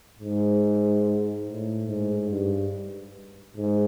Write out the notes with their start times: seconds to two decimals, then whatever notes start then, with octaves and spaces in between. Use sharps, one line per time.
0.19 G#2
1.46 A2
1.87 G#2
2.30 G2
3.57 G#2